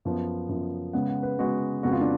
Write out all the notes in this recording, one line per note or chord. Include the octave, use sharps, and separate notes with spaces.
F#2 F3 B3
F#2 F3 B3
C#3 G#3 B3 F#5
F#5
B4
C#3 G#3 B3 F#4
F2 C#3 G#3 B3 F#4
F4
D4